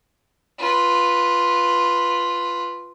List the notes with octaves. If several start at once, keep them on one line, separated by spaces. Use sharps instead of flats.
F4 B4